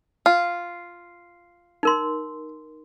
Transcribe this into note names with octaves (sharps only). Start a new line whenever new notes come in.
F4
D#4 A#4 C6